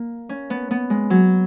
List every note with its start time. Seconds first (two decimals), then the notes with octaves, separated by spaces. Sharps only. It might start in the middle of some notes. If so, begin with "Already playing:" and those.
Already playing: A#3
0.29 C#4
0.50 B3
0.71 B3
0.90 G#3
1.10 F#3